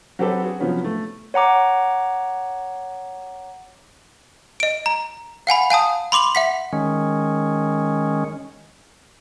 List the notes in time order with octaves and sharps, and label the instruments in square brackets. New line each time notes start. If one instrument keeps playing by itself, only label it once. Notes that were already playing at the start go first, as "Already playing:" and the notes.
[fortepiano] F#3 C4 G4 A4 B4 C#5
F#4 G#4
C3 F3 F#3 B3 C#4
A3
[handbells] C#5 F#5 A#5 D6
[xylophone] D#5 D7
A#5
F5 F#5 G#5 B5
F5 G#5 A5 D#6
B5 C6 D6 F7 F#7
E5 F#5 B6
[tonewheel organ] D#3 G#3 C#4